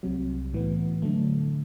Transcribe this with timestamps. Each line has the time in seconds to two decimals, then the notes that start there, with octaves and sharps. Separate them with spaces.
0.03 C2 C3 F#3
0.53 A2 E3 B3
1.02 D3 F#3 A3